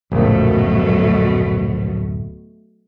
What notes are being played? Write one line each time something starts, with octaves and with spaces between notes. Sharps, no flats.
D1 A#1 F#2 B2 F#3 A3 A#3